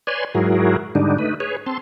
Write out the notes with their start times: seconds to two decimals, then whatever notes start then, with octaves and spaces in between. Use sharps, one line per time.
0.07 B4 C#5 D5 G#5 C6
0.35 G#2 F#3 E4 F#4 G#4 A#4
0.95 G#2 D3 G3 D4 D#4
1.18 A3 D#4 B4
1.40 G#4 B4 C#5
1.66 C4 A5 C6